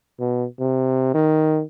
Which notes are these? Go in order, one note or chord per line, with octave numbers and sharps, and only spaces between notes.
B2
C3
D#3